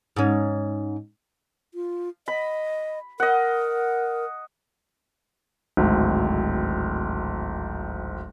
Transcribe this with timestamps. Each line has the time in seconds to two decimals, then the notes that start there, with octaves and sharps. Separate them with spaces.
0.16 G#2 C#4
1.74 F4
2.28 D#5 B5
3.20 A#4 D#5 F#5
5.77 D1 G#1